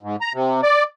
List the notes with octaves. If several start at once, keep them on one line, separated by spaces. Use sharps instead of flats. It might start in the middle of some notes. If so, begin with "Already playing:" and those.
G#2
A#5
C3
D5